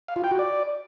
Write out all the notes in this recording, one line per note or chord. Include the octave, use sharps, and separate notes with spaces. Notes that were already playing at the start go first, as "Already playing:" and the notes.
F5
F4
G5
F#4
D5